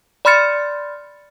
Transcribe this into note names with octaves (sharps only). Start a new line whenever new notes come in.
D5 B5 C6 F6 A6 C#7